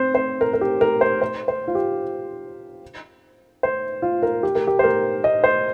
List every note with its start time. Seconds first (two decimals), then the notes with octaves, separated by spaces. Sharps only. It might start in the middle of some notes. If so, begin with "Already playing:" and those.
Already playing: C4 C5
0.15 C5
0.41 A#4
0.53 A#4
0.61 G4
0.81 A#4
1.01 C5
1.22 C5
1.48 C5
1.68 F4
1.75 G4
3.63 C5
4.02 F4
4.23 A#4
4.43 G4
4.55 A#4
4.67 G4
4.79 C5
4.84 A#4
5.24 D#5
5.44 C5